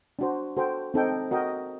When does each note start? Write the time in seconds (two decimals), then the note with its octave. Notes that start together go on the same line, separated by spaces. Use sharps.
0.19 D4 F#4 C5
0.57 F#4 A4 C5 G5
0.94 C4 D#4 A4 D5 G5
1.31 F#4 A#4 D#5 G5